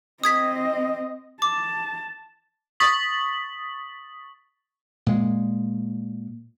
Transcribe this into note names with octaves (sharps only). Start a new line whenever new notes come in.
C4 D#5 D#6 G#6 B6
A5 D6
C#6 D#6 A6 B6 F#7
A#2 G#3